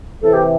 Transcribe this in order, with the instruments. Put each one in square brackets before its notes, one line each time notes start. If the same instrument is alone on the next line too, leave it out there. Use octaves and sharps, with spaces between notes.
[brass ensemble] C3 E3 [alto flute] A4
[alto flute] G4